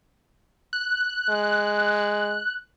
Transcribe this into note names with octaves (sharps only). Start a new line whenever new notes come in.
F#6
G#3